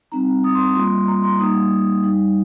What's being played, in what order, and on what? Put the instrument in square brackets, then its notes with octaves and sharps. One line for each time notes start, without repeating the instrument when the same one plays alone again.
[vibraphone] G3 C4 D#4 A#5
D#6
C6
D#6
G3 A#3 F4 C6
A#5
C6
G3 A#3 D#4 D#6
G3 D#4